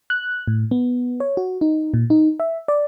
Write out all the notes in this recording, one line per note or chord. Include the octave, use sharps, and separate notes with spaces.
F#6
A2
B3
C#5
F#4
D#4
A#2
D#4
E5
D5